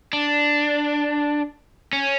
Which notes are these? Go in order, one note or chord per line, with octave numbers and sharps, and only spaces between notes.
D4
C#4